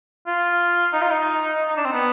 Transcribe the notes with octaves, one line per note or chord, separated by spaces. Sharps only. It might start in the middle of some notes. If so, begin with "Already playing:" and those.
F4
D#4
F4
D#4
D#4
D4
C4
B3